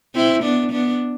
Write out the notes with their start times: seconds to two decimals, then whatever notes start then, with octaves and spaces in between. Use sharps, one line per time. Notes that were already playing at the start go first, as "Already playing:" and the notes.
0.15 C4 E4
0.43 B3 D4
0.72 B3 D4